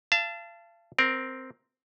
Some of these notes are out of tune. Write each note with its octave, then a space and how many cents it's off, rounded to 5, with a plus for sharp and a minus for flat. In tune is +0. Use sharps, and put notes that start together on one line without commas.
F5 -35 A5 +0
C4 +0 A#4 +15